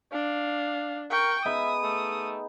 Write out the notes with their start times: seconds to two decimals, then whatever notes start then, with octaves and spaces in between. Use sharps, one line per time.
0.13 D4 F5
1.11 A#4 G5 C#6
1.45 B3 D#4 G#4 E5 D#6
1.83 A3